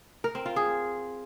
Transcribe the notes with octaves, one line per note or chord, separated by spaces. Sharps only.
A#4
C4
F4
G#4